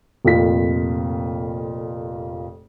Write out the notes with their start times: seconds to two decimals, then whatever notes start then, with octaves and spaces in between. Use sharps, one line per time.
0.25 F1 F2 A#2 F4 B6